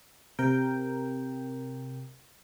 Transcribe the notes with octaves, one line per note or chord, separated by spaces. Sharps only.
C3 A#4 G5